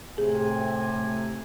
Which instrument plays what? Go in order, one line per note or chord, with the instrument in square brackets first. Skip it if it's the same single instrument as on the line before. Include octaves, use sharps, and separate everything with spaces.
[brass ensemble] A2 C3 G#5 [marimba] G#4